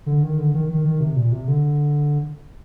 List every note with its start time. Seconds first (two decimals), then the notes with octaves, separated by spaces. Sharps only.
0.06 D3
0.23 D#3
0.38 D3
0.54 D#3
0.69 D#3
0.85 D#3
1.00 C3
1.16 A#2
1.32 C3
1.48 D3